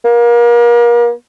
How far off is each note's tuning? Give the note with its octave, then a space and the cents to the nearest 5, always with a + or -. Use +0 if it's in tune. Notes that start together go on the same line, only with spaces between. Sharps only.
A#3 +35